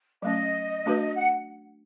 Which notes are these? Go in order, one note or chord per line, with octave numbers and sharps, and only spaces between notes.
F#3 A3 C#4 D#5
A3 D4 F#4 B4
F#5